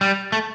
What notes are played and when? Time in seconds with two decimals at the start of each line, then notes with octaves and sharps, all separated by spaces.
0.01 G3
0.32 A3